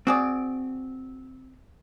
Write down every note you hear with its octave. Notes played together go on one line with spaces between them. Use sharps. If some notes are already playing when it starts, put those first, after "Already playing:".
C4 F#4 G#4 D5